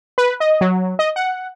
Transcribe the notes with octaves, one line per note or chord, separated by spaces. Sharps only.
B4
D#5
F#3
D#5
F#5